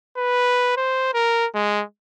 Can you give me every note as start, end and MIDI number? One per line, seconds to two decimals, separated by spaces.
0.17 0.76 71
0.77 1.12 72
1.14 1.46 70
1.55 1.83 56